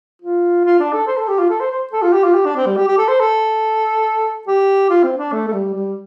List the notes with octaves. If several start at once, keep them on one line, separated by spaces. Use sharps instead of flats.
F4
F4
D4
A4
C5
A4
G4
F4
A4
C5
C5
A4
F4
G4
F4
G4
D4
C4
G3
G4
G4
A4
C5
A4
G4
F4
C4
D4
A3
A3
G3
G3